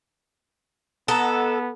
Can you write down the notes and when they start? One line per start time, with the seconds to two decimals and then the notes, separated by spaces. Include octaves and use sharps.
1.08 B3 A4 D#5 F#5 A#5